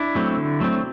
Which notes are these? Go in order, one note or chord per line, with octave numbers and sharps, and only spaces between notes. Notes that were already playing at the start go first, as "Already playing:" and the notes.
Already playing: D4 E4
F#3 A3 C4
D3
F#3 A3 C4